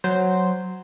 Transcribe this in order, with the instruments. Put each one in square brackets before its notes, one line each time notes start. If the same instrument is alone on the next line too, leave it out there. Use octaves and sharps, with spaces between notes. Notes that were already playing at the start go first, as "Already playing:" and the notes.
[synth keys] F#3 C5